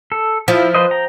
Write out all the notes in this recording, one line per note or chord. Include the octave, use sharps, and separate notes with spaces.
A4
F3 E4
B4 C5 D#5
G5 A#5